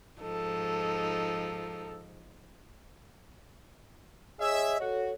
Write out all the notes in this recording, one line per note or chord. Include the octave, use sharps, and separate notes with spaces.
G#2 F3 D#4 A4
G#4 C#5 D#5 E5
F#4 A4 C#5